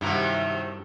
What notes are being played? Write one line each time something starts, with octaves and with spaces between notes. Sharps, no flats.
G2 C3 D#3 F#3 E4 A#5